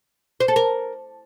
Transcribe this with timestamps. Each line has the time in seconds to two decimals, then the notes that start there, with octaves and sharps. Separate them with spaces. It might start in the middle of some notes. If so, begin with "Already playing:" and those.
0.40 C5
0.48 A4
0.56 A#4